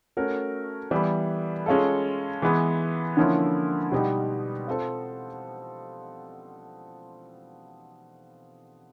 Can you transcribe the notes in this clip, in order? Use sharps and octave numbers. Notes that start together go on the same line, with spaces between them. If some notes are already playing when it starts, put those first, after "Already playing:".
A3 C#4 F#4 A#4
E3 G3 B3
G#3 C#4 F4 A4
E3 G#3 B3
D3 F3 A#3 C#4 E4
B2 G3 B3 D#4 G4
C4 F4 A4 C5